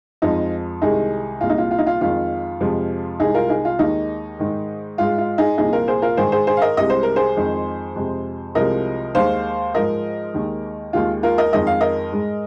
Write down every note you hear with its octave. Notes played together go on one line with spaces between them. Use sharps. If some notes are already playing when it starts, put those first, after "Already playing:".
F2 F3 G#3 D#4
C2 C3 D#3 G#3 D#4 G#4
C2 A#2 G#3 F4
D#4
F4
F4
D#4
F4
F2 D#3 G#3 F4
F2 C3 F3 G#3
C2 C3 G#3 D#4 G#4
F4 A#4
D#4 G#4
F4
D#2 D#3 G#3 D#4
G#2 D#3 G#3
G#2 G#3 F4
F4
D#4 G#4
C2 A#2 F3 D#4 G#4
F4 A#4
G#4 C5
F4 A#4
G#2 D#3 G#3 G#4 C5
G#4 C5
G#4 C5
F5
A#4 D#5
C2 C3 G#3 D#5
C5
A#4
G#4 C5
F2 D#3 G#3
F2 C3 G#3
C2 C3 F3 G#3 A#4 D#5
D#2 D#3 G#3 C5 F5
G#2 F3 G#3 A#4 D#5
D#2 D#3 G#3
D#2 D#3 G#3 F4
F4 A#4
A#4 D#5
F2 D#3 G#3 D#5
F5
A#4 D#5
G#2 G#3